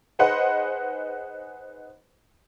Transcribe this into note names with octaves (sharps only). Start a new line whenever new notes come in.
D#4 G#4 B4 C5 D#5 F#5